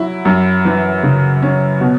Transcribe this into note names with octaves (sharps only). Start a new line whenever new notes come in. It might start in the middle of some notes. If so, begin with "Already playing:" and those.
Already playing: F#3 E4
F#2
E3
C#3
C#4
B2